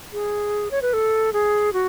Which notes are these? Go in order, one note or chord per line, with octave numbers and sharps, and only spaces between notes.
G#4
C#5
B4
A4
G#4
F#4